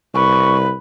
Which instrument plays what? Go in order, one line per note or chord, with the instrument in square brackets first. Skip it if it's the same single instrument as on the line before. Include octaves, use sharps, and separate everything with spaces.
[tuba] C2 [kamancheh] B4 [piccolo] C#6